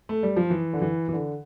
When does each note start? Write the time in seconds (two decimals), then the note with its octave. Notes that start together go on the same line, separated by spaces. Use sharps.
0.09 A3
0.23 G3
0.36 F3
0.50 E3
0.73 D3
0.82 E3
1.08 E3
1.13 D3